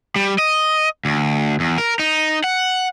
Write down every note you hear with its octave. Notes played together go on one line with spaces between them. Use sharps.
G3
D#5
D2
E2
A#4
D#4
F#5